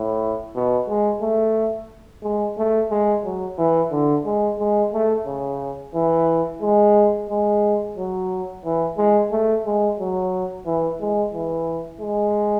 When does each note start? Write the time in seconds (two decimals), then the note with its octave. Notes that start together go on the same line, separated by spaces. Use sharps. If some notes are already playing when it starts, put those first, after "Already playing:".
Already playing: A2
0.55 B2
0.89 G#3
1.22 A3
2.23 G#3
2.58 A3
2.91 G#3
3.24 F#3
3.58 E3
3.92 D3
4.25 G#3
4.59 G#3
4.93 A3
5.26 C#3
5.95 E3
6.62 G#3
7.30 G#3
7.97 F#3
8.65 E3
8.98 G#3
9.32 A3
9.65 G#3
10.00 F#3
10.66 E3
11.00 G#3
11.34 E3
12.01 G#3